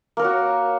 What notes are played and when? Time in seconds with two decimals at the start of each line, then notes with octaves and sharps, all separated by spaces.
0.17 A#3
0.19 A#4
0.22 C#5
0.24 F#4